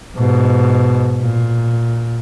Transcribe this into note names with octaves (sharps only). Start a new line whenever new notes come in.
G#2 B2
A#2